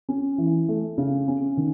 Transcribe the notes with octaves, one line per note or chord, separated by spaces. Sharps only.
C#4
E3
A3
C#3
C#4
D#3